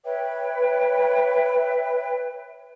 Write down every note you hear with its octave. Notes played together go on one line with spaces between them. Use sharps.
B4 C#5 E5 G5